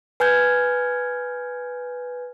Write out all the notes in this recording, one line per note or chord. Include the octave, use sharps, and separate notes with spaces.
B4 G#5 F6 G6 G#6